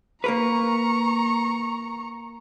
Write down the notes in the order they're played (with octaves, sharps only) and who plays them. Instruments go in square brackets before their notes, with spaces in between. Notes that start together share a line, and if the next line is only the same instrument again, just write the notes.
[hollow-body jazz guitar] A#3 A#4 B4 [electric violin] A#5 C#6